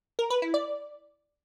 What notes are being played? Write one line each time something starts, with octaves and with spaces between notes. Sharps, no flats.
A#4
B4
E4
D5